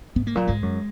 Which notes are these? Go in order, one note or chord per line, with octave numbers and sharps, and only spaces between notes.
G#2 B3
A#3
A#2 F#3
G#2 G#3
F#2